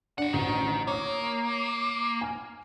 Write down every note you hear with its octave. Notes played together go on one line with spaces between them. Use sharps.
D4 G4 F#5
A1 D2 D#3
A#3 C#5 D#6
G#5 F6